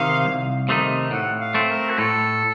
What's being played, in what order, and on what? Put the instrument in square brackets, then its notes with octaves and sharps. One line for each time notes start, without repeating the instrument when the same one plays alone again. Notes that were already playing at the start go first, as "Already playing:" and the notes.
Already playing: [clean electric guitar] C3 D#3 D#4 [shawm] F5
[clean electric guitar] C2
C3 D#3 A3 D#4
[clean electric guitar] A2 [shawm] F#5
[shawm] F5
[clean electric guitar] A3 C4
[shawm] A#4
F#4
[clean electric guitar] A2 [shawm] A4